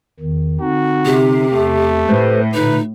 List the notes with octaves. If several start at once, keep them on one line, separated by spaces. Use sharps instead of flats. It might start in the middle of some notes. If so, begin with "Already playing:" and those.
E2 D#3
D3 C4 D#4 F#4
C3 G4
E2 A3
A2 A4 B4 C5
A#2 D3 A3 D#4 B4